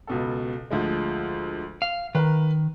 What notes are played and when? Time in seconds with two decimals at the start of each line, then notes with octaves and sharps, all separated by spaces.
0.07 C#2 B2 A4
0.71 D2 F3 G#3
1.82 F5
2.15 D#3 A#4 B4